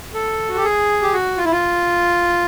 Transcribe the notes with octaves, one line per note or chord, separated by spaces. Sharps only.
A4
F#4
G4
G#4
G4
F#4
F4
E4
F4